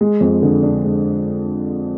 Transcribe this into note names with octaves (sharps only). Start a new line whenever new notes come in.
G#3
F2
D3
D4
G#3